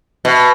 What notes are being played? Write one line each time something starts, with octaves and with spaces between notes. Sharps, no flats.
B2